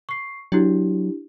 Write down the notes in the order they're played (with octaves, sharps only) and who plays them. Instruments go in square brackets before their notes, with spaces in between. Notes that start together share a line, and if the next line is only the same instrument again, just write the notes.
[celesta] C#6 C7
[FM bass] F#3 [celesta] D4 E4 G4